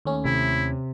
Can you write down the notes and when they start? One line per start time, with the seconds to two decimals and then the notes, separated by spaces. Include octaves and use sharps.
0.05 D#2 A3 C#4
0.25 C3 E4